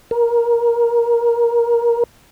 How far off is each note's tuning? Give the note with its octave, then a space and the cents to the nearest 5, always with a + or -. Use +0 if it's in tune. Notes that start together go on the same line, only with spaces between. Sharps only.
A#4 +15